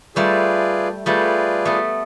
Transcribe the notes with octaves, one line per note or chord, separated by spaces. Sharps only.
G3 A3 F4 G#4 B4 D5
G3 A3 F4 G#4 B4 D5
A3 B3